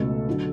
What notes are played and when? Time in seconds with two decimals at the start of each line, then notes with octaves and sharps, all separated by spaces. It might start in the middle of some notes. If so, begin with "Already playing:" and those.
Already playing: C#2 B2 A3 C#4 A4
0.29 D3 F#3